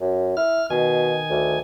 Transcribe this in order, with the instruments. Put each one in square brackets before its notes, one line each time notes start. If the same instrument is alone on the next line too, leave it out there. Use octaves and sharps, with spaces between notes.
[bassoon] F#2
[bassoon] E4 [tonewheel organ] F6
[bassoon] B2 [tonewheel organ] D#3 G#5
[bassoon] D2